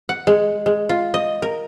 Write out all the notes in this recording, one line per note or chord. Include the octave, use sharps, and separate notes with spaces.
F#5
G#3
G#3
F4
D#5
A#4